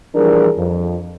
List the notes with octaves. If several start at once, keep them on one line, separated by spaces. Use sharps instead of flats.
E3 F3 G3 D4 G#4 A#4
F2